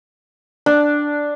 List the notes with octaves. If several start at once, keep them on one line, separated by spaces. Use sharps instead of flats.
D4